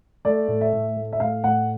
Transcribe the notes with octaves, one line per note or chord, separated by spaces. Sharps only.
A3 D5
A2
E5
A2
A3
E5
A2 F5
A2 F#5